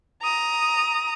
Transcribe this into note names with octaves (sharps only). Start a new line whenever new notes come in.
A#5 D#6